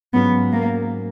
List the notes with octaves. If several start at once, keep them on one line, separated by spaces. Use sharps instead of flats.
G#2 F#3 B3 C#4 F4
A#3